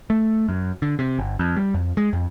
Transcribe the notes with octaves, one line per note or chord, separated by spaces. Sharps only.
A3
F#2
D3
C3
G1
F2
G3
F2
G#3
F2